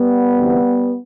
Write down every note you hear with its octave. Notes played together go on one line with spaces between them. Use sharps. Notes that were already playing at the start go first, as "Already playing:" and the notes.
Already playing: G3 B3
D2 C3 E3